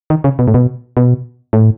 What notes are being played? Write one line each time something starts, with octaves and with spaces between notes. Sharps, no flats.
D#3
C#3
B2
A2
B2
B2
A2